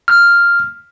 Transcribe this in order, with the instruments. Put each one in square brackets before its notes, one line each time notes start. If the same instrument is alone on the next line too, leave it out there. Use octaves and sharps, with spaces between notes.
[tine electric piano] F6